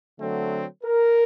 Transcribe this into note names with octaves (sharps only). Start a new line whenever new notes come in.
D3 F#3 A3 C4
A#4